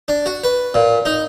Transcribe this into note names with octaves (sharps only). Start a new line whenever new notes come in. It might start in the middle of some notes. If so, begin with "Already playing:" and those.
D4
F#4
B4
A#2
D#4